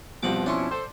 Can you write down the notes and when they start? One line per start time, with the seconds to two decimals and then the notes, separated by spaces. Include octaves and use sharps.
0.23 G2 B2 F3 C4 F#5 D6
0.46 C#4 D4 E4 C6 C#6
0.71 A4 C5